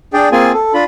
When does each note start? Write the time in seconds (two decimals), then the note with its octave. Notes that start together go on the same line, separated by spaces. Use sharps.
0.13 D4 G#4 D5 G5
0.32 A#3 C4 F4 G#4 G#5
0.53 A4
0.74 D4 F4 B5